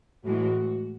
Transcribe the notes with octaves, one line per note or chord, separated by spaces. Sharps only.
A2 E3 G#3 F#4